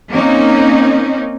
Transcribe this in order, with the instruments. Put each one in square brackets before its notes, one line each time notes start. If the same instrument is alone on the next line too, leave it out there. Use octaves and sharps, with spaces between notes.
[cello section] A#3 C4 C#4 D#4